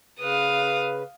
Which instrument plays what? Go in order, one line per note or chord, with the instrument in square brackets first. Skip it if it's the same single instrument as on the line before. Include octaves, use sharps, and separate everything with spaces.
[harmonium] C#3 B4 [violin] F5 D#6